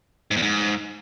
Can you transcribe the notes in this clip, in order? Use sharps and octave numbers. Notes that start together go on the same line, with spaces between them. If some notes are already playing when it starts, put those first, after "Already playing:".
G#2
E2
G#2